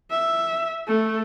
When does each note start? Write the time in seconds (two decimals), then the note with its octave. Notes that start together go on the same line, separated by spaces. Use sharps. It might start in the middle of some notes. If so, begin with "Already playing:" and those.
0.10 E5
0.87 A3